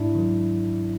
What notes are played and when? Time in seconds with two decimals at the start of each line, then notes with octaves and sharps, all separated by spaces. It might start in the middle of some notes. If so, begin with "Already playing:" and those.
Already playing: G#2 D4 E4
0.15 D#3 F#3